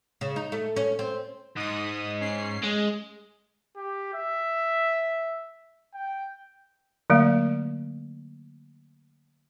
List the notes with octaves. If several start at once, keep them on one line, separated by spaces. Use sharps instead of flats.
C#3
D#4
A3
C#4
C4
G#2 D#6
C#4 C7
G#3
G4
E5
G5
D3 F#3 A3 A#3